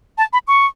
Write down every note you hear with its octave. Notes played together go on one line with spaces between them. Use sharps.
A5
B5
C#6